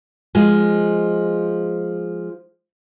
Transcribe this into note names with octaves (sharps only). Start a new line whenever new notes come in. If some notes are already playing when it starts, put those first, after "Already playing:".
F3 G#3